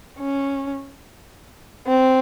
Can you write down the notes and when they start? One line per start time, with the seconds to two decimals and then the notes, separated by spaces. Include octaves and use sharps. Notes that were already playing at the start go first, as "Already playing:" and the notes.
0.19 C#4
1.87 C4